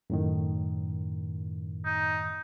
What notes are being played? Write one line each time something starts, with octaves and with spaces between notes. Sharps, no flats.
F#2 A2 D#3
D#4